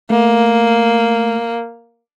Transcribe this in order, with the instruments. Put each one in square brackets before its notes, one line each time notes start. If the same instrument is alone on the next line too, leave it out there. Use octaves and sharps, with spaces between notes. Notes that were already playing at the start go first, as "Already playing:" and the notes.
[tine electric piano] A3 [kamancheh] A#3